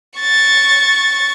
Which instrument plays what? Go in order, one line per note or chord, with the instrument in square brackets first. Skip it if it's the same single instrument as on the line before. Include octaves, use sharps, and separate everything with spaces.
[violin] C#6 A6